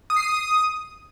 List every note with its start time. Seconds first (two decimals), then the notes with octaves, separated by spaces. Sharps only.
0.10 D#6
0.16 C7
0.23 D#6